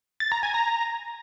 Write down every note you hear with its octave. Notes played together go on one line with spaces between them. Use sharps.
A6
A#5
G#5
A#5